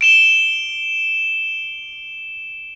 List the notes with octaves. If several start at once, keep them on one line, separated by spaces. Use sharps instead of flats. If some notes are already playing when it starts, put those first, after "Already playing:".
D7 E7 G7